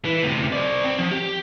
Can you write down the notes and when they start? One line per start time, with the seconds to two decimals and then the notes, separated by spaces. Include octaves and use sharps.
0.05 E3
0.23 D2 C3
0.52 C5 D5
0.84 C4
0.99 F3
1.11 G4